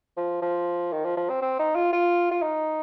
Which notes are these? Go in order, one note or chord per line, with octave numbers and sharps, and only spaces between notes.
F3
F3
D#3
F3
F3
C4
C4
D#4
F4
F4
F4
D#4